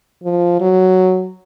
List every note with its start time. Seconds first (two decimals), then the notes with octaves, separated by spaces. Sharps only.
0.24 F3
0.61 F#3